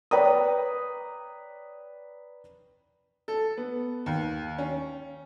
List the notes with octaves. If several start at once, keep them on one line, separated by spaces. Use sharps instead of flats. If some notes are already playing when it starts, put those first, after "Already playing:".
B4 C#5 D5 G5 A#5 D#6
A4
B3
D#2
C#4